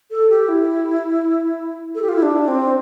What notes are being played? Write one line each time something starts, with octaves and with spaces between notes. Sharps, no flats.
A4
G4
E4
A4
G4
F4
E4
D4
C4